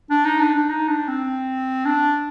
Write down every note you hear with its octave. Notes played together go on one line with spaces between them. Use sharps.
D4
D#4
D4
D4
D#4
D4
C4
D4